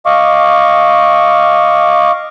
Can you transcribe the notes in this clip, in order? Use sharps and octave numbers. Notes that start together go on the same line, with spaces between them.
D#5 F5 C#6 D6